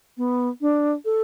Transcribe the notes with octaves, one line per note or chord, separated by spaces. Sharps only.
B3
D4
A4